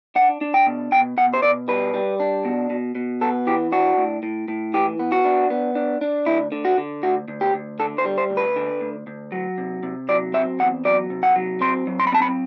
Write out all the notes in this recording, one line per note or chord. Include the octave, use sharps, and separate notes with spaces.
D4 F#5
D4
G5
B2
B2 G5
B2 F#5
C5
B2 D5
G3 B4
G3
D4
B2
B2
B2
B3 A4
E3 G4
D4 F#4
A2
A2
A2
E3 G4
B3
F#4
D4
B3
D4
D4
D2 E4
D3
F#4
D3
D2 F#4
D2
G4
D2
D3 A4
C5
G3
C5
D2
B4
D3
D2
D2
F#3
C3
C3
F#3 D5
C4 E5
E2 F#5
F#3 D5
C3
F#5
F#3
C4 C6
F#3
C6
B5
C4 A5
B5